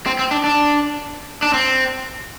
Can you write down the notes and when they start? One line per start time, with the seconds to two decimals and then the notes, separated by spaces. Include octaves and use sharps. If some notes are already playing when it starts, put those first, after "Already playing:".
0.06 C4
0.19 C4
0.31 D4
0.44 D4
1.42 D4
1.53 C4